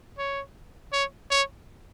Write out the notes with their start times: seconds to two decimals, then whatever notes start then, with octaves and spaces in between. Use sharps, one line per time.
0.18 C#5
0.93 C#5
1.31 C#5